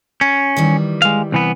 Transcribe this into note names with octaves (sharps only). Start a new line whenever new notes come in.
C#4
D#3 E3 G3
G#3 F5
C2 E3 B3